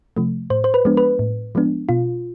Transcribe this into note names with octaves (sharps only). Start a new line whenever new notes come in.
C3 F3 A3
A2 C5
C5
B4
F3 G#3 B3 D4
B4
A2
F3 G#3 B3 D4
B2 F4